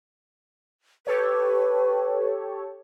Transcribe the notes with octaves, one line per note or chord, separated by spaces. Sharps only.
G4 A4 B4 C#5